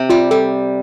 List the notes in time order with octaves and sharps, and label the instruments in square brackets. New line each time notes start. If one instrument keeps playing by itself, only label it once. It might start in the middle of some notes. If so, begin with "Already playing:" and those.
Already playing: [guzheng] C3
[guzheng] G3 [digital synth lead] F4
[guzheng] G3 [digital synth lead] A4